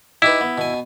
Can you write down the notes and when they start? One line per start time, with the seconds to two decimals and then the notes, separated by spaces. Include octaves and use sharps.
0.22 D#4 E4 G4 B4
0.41 B3
0.58 B2 G#5